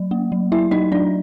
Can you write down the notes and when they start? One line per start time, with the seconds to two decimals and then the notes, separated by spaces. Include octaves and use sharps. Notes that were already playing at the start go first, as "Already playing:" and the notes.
Already playing: F#3
0.11 A#3
0.32 F#3
0.52 F#3 E4 E5
0.71 F#3 D#4 D#5
0.92 F#3 D4 D5